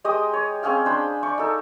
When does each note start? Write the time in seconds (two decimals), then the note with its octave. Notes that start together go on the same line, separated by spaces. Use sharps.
0.04 G#3 G4 D#5 D#6
0.33 C#5
0.63 C4 C#4 G#4 F5
0.86 D4 C5 B5
1.23 D5 C#6
1.38 D#4 A4